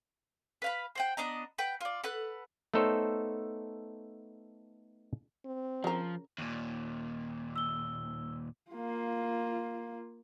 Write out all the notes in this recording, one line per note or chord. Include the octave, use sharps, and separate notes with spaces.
B4 F5 B5
C5 F#5 G5
B3 D4 D#5 A#5
B4 F#5 G5
F4 D5
A4 B4 F#5 F#6
A3 B3 D#4 A4 C5 C#5
C4
C#3 F3 A#4
D#2 A#2
E6 G7
A#3 F4